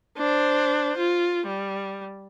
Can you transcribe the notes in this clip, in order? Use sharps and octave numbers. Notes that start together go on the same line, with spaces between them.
D4 C5
F4
G3